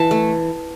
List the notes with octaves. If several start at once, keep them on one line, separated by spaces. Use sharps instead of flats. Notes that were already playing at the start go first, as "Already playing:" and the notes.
Already playing: E3 A5
A3